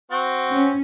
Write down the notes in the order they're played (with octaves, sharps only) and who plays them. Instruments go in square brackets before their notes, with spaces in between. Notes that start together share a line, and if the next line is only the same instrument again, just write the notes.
[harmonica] C4 F#4
[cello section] C#4